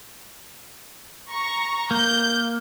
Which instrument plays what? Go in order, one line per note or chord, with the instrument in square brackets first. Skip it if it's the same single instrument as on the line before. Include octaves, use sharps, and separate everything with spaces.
[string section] A#5 C#6
[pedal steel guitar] A#3 [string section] G6